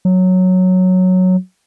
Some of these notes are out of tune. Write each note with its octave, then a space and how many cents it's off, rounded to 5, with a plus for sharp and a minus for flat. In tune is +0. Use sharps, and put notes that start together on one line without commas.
F#3 -5